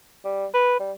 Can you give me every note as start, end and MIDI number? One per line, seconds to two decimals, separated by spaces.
0.25 0.46 55
0.54 0.78 71
0.80 0.92 55